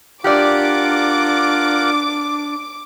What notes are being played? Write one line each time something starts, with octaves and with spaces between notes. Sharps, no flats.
D4 F4 G4 A#4 D5 F#5 D6